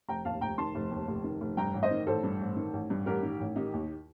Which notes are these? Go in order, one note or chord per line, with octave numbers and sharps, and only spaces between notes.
F1 G5 A#5
D#2 F5 A5
F1 G5 A#5
D#3 A5 C6
F1
D#2
F1
D#3
F1
G2 G5 A#5
A1
C5 D#5
D#3
A1 A4 C5
G2
A1
D#3
A1
G2
A1 G4 A#4
D#3
A1
D#3 D#4 G4
D#2